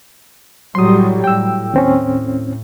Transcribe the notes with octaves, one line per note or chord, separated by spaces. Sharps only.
A2 F#3 G3 C6 D#6
A2 G5 E6
D#2 C4 C#4